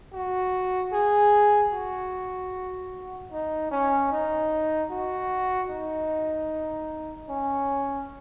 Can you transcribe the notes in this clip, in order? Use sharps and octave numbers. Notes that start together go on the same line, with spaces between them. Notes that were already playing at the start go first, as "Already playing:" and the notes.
F#4
G#4
F#4
D#4
C#4
D#4
F#4
D#4
C#4